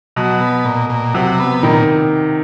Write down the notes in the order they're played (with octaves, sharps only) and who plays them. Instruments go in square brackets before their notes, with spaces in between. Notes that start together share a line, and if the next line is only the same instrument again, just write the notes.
[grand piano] B2 [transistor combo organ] F#3
[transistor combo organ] B3
A#2
A#2
[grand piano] C3 [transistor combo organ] F#3
[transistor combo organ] B3
[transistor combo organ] A#2 [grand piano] D#3